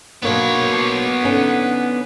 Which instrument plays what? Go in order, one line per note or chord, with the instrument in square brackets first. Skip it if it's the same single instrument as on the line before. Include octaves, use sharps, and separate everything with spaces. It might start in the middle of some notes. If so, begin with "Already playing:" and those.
[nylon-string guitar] B2 A#3 D4 [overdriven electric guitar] B3 C#5
[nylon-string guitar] D3 C#4 D#4